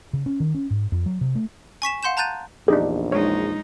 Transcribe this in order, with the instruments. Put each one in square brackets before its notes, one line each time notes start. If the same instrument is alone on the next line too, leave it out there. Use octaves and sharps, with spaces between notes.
[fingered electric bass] C#3
C#4
D#3
C#4
G#2
F2
F#3
C3
A3
[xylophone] G#5 C#6 B6 E7
F5 F#5 C6 G6 E7
A5 A#5 F#6 G6 A6 D#7
[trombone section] A#1 E2 [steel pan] D4 D#4 G4 [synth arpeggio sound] G#4
[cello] G#3 D#4 [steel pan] C#5